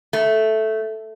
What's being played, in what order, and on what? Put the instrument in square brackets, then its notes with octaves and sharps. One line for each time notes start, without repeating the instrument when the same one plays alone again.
[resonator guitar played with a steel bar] A3